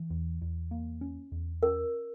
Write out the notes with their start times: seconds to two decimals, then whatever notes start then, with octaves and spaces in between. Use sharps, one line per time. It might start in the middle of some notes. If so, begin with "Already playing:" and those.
Already playing: E3
0.10 E2
0.42 E2
0.71 A#3
1.01 C#4
1.32 E2
1.63 C#4 A#4